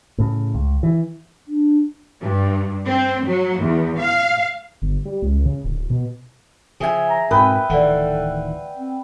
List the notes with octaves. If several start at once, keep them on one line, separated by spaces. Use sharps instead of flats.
A2 C#3
C#2
E3
D4
G2
C4
F#3
E2
F5
G1
G3
C#2
C#3
D1
B2
C#3 F3 G#4 E5 G#5
A#5
G#2 B2 C4 A#4 B4 G5 D#6
D1 D#3 E3 A4 D5 F#5
C4